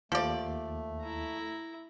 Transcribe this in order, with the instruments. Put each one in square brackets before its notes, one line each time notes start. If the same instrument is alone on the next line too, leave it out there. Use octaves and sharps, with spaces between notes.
[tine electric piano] D#2 [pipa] F3 D5 [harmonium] A3
[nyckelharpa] E4 A#5